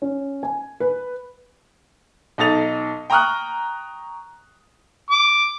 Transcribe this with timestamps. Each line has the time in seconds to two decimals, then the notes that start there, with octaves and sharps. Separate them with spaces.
0.02 C#4
0.43 G#5
0.80 B4
2.38 B1 D#4 A4 D#6 A6 F7
3.10 G5 A#5 C#6 D#6 F6 F#6
5.11 D6